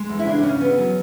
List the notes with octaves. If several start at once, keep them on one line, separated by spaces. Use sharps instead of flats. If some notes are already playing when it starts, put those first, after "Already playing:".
Already playing: G#3
E2
E4
C#3 D4
C#3 C#4
E2 B3
F#3